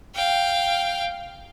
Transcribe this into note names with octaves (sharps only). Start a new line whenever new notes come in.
F5 G5